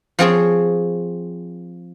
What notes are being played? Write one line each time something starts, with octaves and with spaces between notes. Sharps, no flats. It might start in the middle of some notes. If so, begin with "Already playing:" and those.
F3 C4 G#4 C#5